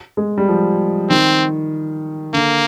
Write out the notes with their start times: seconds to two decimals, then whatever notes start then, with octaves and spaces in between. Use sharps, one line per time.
0.17 G#3
0.38 G3
0.48 F3
1.09 D#3 C4
2.33 D3 A#3